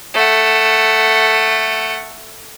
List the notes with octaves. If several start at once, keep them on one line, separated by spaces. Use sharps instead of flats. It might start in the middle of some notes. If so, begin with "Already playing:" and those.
A3 F#5